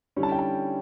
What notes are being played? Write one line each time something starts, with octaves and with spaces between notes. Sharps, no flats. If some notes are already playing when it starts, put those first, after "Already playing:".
D3 G3 C#4 E4
A5
G5
A5